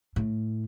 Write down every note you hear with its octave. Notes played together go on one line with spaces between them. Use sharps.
A2